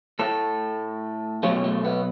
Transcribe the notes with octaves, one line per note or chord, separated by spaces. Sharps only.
A2 A3 A4
B2 F#3 A3 C#4
A3
B3